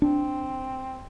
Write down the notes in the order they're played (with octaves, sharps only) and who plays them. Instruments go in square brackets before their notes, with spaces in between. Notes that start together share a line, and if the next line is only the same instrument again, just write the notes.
[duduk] C4 [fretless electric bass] D4